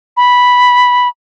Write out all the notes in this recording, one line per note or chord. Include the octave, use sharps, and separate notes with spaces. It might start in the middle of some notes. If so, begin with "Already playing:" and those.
B5